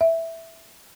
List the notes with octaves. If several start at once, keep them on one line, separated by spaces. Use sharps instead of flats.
E5